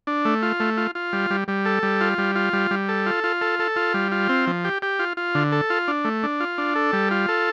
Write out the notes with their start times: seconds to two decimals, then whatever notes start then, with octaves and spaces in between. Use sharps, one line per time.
0.07 D4
0.25 A3
0.42 F4
0.60 A3
0.77 F4
0.95 F4
1.13 G3
1.30 G3
1.48 G3
1.65 A4
1.83 G3
2.01 F4
2.18 G3
2.35 F4
2.53 G3
2.71 G3
2.89 A4
3.06 F4
3.24 F4
3.41 A4
3.59 A4
3.76 F4
3.94 G3
4.12 F4
4.29 C4
4.47 F3
4.65 G4
4.82 G4
4.99 F4
5.17 F4
5.35 D3
5.52 A4
5.70 F4
5.88 D4
6.05 A3
6.23 D4
6.40 F4
6.58 D4
6.75 A4
6.93 G3
7.11 F4
7.29 A4